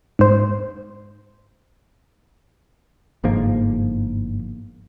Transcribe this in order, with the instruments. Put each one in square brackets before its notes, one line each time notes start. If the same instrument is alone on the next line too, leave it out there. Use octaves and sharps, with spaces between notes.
[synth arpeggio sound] G#2 C5
[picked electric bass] G1 G#2 F3 A#3